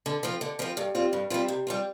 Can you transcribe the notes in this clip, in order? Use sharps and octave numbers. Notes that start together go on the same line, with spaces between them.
D3
F3 C4 F4
D3
F3 C4 F4
G2
G3 C4 F4
G2
G3 C4 F4
C3
G3 C4 F4